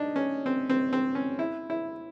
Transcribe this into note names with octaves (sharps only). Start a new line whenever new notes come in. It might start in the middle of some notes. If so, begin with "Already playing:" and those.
Already playing: D4 D#4
C#4
C4
C4
C4
C#4
E4
E4